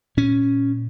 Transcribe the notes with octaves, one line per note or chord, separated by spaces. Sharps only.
A#2 C#4